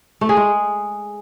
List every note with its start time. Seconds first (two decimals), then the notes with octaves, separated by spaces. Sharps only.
0.21 A3
0.29 G#4
0.37 G#3